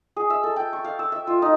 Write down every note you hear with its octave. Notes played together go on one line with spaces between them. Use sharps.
G#4
E5
A4
G5
C#6
F5
E6
E5
F4
D#4